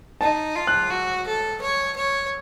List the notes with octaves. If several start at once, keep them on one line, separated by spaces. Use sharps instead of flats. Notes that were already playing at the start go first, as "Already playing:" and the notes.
D#4 A5
F4
F#6
F#4
A4
C#5
C#5